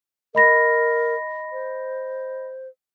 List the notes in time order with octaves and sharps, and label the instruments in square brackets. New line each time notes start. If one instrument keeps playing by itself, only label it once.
[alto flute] A#4 [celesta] D#5 B5 A#6
[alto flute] C5